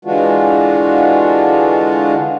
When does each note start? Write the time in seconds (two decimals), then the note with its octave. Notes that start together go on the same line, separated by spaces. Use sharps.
0.05 D3 E3 G#3 D4 F4 F#4